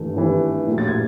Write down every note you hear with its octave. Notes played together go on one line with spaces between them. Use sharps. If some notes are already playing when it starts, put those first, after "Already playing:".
Already playing: G#1 G2 E3 A3
G#1 G2 E3 A3
A#1 A2 F#3 A3
A6
G#6